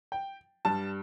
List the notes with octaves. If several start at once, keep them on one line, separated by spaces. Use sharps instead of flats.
G5
G2 G3 A5